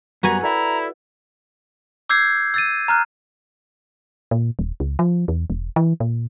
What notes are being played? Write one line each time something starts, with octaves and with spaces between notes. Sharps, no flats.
F#2 G3 B3 F#4 B4 G#5 A#5
E4 A4 D5 E5 A#5
D6 E6 G6 G#6 C7
E6 A6 D#7
A#5 F6 F#6
A#2
D#1
C#2
F3
E2
E1
E3
A#2